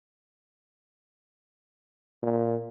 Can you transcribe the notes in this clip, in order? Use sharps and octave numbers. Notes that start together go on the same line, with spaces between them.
A#2